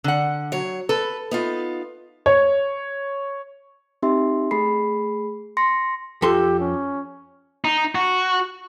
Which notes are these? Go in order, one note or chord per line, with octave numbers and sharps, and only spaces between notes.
D3 F#5
F#3 C#5
A4 B4
B3 D#4 F4
C#5
C4 D#4 G4 E5 C6
A3 G#4 B5 C7
C6 A#6 C#7
F2 G4 A4 C6
C#4
D#4
F#4